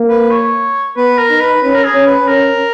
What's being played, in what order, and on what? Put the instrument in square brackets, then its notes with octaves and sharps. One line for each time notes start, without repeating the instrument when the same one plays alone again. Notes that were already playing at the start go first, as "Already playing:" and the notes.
Already playing: [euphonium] A#3
[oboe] B4
C#5
[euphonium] B3 [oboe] B4
[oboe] A#4
[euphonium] D#4
[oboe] B4
[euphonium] C#4 [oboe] B4
[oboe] A#4
G#4
[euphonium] C#4
[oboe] B4
[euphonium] C#4 [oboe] A#4